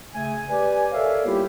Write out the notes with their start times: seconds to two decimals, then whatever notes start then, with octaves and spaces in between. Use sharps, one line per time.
0.15 C#3 A3 G#4 G#5
0.49 G4 B4 D5 G#5
0.91 A4 A#4 C#5 D5 E5 F5
1.24 G3 A#3 B3 E4 F4 G4